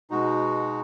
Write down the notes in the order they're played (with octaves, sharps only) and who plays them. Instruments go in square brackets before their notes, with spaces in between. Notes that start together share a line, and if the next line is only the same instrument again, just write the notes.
[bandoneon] B2 G#3 D#4 F#4